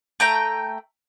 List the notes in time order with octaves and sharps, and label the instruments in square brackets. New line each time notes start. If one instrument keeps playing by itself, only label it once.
[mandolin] A3 G5 A#5